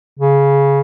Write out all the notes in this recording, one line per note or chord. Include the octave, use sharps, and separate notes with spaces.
C#3